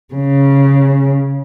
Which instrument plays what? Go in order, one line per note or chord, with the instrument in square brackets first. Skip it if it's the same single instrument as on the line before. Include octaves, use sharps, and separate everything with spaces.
[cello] C#3